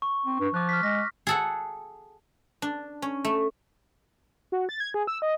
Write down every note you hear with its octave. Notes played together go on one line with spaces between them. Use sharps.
C#6
C4
G2
F3 D6 F#6
F6 B6
G#3 A#6
G#4 A4 F#5
D4
C#4
A3
F#4
A6
G#6
G#4
E6
D#5